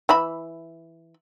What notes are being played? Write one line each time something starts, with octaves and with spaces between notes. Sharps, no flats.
E3 E5 B5